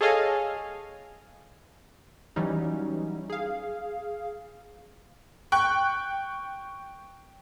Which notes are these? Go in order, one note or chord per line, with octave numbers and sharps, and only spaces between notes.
G#4 A4 C#5 D#5 F5 G#5
E3 F#3 G3 C#4 D#4
G#4 F5
G5 C#6 F#6